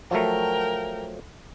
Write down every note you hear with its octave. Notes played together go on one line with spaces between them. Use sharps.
F3 F#3 A3 A#4 G5